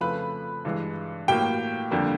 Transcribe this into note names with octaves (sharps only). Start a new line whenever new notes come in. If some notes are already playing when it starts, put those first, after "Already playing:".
F2 C#3 F3 A3 B4 B5
G2 E3 G#3
A2 F#3 A#3 G4 G5
F2 D3 G3 A#3